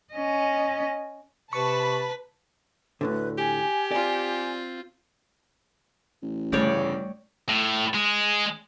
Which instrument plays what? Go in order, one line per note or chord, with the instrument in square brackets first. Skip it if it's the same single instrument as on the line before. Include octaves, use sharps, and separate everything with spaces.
[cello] C#4 D#5
[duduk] C3 [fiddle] B4 [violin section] A5 B5 [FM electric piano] C#6
[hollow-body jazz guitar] D2 A2 D3 [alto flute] B4
[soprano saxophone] G4 [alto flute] G#5
[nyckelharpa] C4 F4 [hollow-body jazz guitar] D5
[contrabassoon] A1
[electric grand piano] G1 C#3 [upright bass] G3 A3 [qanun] C#5 D5 G5
[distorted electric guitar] A2
G#3